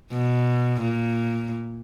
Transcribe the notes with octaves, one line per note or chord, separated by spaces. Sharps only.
B2
A#2